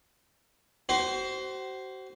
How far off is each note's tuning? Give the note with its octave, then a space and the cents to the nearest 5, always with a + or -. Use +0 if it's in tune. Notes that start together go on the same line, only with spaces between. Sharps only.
F#4 +40 C5 +0